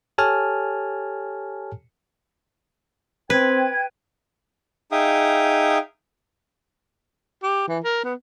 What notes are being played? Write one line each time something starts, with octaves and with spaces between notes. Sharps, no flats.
G4 A4 C#5 G#5 A5 F6
C4 B4 G5 G#6
D#4 G#4 E5 F5 G5 D#6
G4
E3
A#4
B3